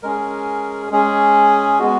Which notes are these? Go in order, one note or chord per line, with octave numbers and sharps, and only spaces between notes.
G#3 C#4 G#4 A#4
G#3 C#4 G#4
G#3 B3 F#4